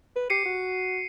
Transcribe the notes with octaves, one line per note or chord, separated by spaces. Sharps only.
B4
G4 C7 C#7 D#7
F#4